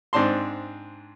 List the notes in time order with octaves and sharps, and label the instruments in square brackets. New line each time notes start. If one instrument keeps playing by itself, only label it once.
[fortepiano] G#2 C4 D4 A5 C6